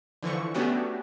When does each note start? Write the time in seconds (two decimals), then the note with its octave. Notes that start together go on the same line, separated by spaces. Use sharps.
0.23 D3 E3 F3 C#6
0.54 A3 B3 C#4 D4 F#4 G4